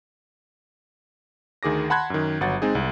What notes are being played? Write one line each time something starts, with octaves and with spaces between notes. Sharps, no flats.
D2 D#3 G#4 D6 A#6
F#5 A5 B5 C6 F#6 G#6
F#2 D#3
G1 F#3 F#5 A6
G#3 C4 D#4 G#4
C2